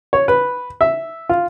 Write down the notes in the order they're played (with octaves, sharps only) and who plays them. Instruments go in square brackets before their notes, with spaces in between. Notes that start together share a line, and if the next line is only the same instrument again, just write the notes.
[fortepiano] C#5
B4
E5
F4